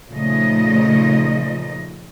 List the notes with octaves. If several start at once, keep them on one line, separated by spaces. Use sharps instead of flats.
A#2 C#3 F3 A3 D#4 D#5